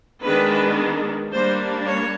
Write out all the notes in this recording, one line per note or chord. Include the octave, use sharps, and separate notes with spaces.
D#3 G#3 B3 D4 B4
G3 A#3 D4 C5
C#5